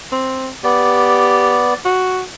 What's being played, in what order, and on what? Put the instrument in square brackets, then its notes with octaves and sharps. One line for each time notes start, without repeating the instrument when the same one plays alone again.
[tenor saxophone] C4
[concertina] B3 D5 [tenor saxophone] G4
[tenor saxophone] F#4